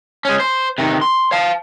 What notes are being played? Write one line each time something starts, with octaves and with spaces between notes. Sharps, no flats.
G#3 C#4
C5
C3 D#3
C6
F5 A5